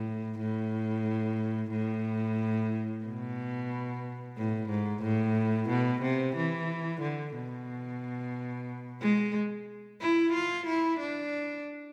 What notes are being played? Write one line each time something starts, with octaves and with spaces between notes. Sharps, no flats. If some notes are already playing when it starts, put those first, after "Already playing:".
Already playing: A2
A2
A2
B2
A2
G#2
A2
B2
C3
E3
D3
B2
G#3
E4
F4
E4
D4